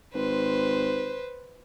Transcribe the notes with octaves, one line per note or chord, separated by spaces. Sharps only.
G#1 B4 C5